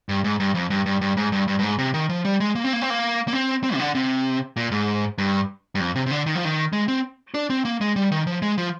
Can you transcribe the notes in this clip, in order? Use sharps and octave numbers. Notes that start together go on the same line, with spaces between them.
G2
G#2
G2
F2
G2
G2
G2
G#2
G2
G2
G2
G#2
C3
D#3
F3
G3
G#3
A#3
C4
A#3
C4
A#3
A#3
C4
C4
C3
D3
C3
A#2
G#2
G2
G2
F2
C3
C3
D3
D#3
F3
D#3
G#3
C4
D4
C4
A#3
G#3
G3
D#3
F3
G#3
F3